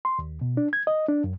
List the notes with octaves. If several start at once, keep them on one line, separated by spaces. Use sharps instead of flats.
C6
D#2
B2
D4
G#6
D#5
D4
F#2